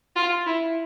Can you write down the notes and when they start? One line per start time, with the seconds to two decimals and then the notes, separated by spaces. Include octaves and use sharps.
0.16 F4
0.46 E4